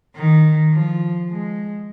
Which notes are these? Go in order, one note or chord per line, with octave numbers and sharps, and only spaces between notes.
D#3
F3
G#3